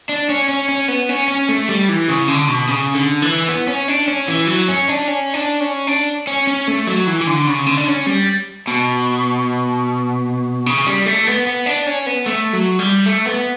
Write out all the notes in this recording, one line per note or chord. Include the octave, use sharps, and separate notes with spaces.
D4
C#4
C#4
C#4
B3
C#4
C#4
A3
G3
E3
C#3
D3
B2
C#3
D3
E3
B3
C#4
D4
C#4
E3
F#3
C#4
D4
C#4
D4
C#4
D4
C#4
C#4
A3
F#3
E3
E3
D3
C#3
D3
D4
C#4
G3
B2
C#3
G3
A3
B3
B3
D4
C#4
B3
A3
F#3
G3
A3
B3